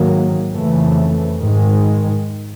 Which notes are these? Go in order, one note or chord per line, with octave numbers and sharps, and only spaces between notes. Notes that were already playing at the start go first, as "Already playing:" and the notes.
Already playing: G#2 D#3 F#3 A#3
F2 C#3 E3 A3
G#2 D#3 G#3